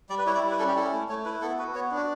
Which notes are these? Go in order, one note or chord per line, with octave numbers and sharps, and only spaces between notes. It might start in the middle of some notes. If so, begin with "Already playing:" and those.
G3 D5
B4
E4 C#5
D5
G3
B4
C#4 A4
G4
E4 A4
A3
A3 C#5
E4 B4
B3 A4
F#4 B4
B3 C#5
D4
F#4